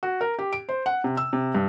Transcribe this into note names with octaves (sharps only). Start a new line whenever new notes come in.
F#4
A#4
G4
D7
C5
F#5
C3
E6
C3
G2